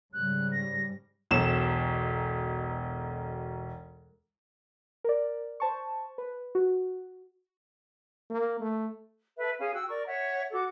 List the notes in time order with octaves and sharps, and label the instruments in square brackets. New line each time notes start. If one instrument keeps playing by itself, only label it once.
[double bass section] G#2 C#3 G3 [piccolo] F#6
[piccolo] A#6
[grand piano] E1 B1 E7
[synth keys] A#4 D5
C5 A5 C#6
B4
F#4
[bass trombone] A#3
A3
[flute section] A4 B4 E5
C#4 G#4 F5
F#4 G5 E6
A#4 D5 C#6
C#5 E5 F#5
F#4 A4 D6